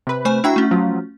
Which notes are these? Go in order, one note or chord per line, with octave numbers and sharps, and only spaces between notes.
C3 B4
A3 C5 G#5
D4 E4 F#4 G5 A#5
A3 C#4
F3 F#3 F4